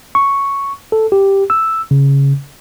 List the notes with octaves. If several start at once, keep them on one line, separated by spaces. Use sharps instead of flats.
C#6
A4
G4
E6
C#3